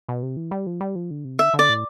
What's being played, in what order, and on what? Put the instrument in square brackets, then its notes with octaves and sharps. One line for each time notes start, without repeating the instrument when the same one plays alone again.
[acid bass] B2
C3
E3
G3
F3
G3
F3
D3
C3
[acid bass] D3 [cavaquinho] E5
[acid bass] D3
[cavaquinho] D5
[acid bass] A2